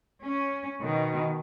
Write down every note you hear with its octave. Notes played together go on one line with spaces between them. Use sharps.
C#4
B2 D#3